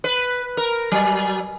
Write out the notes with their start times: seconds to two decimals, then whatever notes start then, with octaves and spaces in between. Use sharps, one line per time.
0.04 B4
0.57 A#4
0.92 F#3